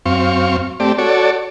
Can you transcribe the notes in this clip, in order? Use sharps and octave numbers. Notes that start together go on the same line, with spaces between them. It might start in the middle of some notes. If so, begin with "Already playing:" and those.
F#2 C4 F5 C#6
A3 C4 G4 D5
F#4 A4 C#5 D5